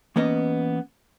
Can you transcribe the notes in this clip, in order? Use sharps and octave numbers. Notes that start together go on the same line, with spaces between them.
E3 A#3 B3 C#4 D#5